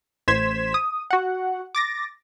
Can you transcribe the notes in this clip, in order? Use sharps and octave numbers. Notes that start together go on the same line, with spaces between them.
A1 C5 C6 G#6 B6 E7
D#6
F#4 F#5
D6 A6 A#6